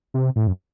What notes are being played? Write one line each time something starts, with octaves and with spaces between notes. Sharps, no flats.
C3
A2
F#2